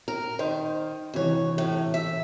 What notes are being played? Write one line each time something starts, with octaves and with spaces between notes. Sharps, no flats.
A#4
D#3 C5
D2 C3 E3 C#5
A2
E5